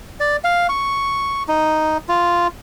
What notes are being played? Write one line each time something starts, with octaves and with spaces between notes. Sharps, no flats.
D5
F5
C#6
D#4
F4